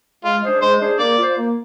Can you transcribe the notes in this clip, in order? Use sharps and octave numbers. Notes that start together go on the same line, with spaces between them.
G#3 F4
D4 G#4 C5
G#3 C5
D4 G#4 C5
A#3 D5
F4 C5
A#3